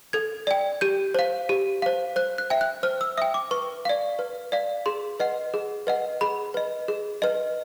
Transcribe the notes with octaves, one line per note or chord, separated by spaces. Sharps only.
A4 G#6
D5 G5
G4 G6
C5 F5
G4
C5 F5
C5 F#6
F#6
E5 G5
F#6
C5 F6
E6
E5 G5 D#6
D6
B4 C#6
D5 F5
B4
D5 F5
G#4 C6
B4 D#5 F#5
G#4
B4 D#5 F#5
G#4 B5
B4 D#5
G#4
B4 D#5